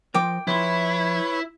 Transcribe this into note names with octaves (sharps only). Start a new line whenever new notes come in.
F3 A#4 C5 G5 D6
F3 E4 B4 C#5 C6